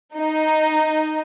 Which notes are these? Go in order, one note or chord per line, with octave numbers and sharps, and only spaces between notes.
D#4